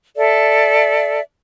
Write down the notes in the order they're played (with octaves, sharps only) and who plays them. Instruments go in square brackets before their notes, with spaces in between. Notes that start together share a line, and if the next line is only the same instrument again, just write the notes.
[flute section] A4 D5 E5